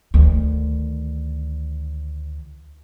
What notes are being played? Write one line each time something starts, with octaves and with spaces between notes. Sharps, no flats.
D2 D#3